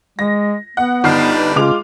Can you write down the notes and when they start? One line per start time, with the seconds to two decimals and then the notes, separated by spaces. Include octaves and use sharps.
0.19 G#3 A#6
0.77 B3 F#5
1.04 G1 G3 D4 D#4 B4 F6 C7
1.56 C#3 G#3 F4 D6 F7